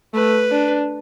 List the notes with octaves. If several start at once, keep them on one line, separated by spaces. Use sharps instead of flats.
A3 B4
D4